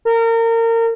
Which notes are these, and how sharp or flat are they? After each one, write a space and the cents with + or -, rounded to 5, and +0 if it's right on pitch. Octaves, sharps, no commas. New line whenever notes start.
A#4 -30